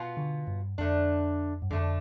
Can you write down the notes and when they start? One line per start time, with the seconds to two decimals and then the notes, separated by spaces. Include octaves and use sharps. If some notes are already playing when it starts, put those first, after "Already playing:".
Already playing: B2 B3 F4
0.17 D3
0.47 G2
0.78 F2 D3 A3 D4
1.62 G2
1.71 F2 D3 A3 D4